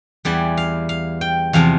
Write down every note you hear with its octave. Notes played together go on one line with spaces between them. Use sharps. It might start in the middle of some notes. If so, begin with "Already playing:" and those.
E2 E3 G3 D5
F5
F5
G5
E2 C3 F3 F5